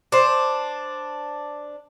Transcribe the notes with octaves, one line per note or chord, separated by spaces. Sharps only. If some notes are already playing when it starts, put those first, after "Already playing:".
D4 C5